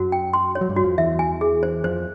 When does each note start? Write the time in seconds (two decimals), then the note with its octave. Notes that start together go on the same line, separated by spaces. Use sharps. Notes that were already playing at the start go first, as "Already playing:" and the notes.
Already playing: F#2 F#3 F#4
0.12 G5
0.33 C6
0.55 C#5
0.61 F#3
0.69 G2 G3
0.76 F#4
0.84 F2 F3
0.98 E2 E3 E5
1.19 G#5
1.41 G#4
1.63 C5
1.84 F2 F3 C5